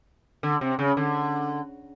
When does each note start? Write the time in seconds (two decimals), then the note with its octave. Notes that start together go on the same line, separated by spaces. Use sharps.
0.43 D3
0.61 C3
0.79 C#3
0.97 D3